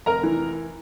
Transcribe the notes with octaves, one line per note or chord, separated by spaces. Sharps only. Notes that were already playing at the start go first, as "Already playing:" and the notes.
F1 A#4 A#5
E3